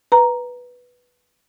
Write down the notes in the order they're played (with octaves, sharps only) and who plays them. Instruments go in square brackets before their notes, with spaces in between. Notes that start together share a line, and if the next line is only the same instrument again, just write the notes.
[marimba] B4 A#5